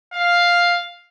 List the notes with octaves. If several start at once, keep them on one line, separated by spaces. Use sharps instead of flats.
F5